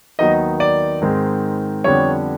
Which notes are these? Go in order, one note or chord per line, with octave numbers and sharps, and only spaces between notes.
D#2 D#3 F#3 B3 D#4 D#5
D5
G#2 D#3 G#3 C4
F2 D3 G3 B3 D4 C#5